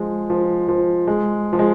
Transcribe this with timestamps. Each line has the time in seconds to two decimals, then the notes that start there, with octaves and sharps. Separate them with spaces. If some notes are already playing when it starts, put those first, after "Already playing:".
Already playing: F3 G#3
0.30 F3
0.68 F3
1.07 G#3
1.53 F3
1.59 G#3